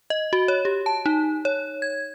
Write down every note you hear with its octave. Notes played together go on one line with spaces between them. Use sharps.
D#5
F#4
C#5
G4
A5
D#4
C#5
G#6